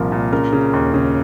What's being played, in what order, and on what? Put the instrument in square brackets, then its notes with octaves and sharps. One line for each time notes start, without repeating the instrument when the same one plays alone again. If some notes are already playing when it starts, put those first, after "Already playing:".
Already playing: [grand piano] C2 A#2 F3 A#4
A#2
C#3 A#4
C#3
D#2
C#3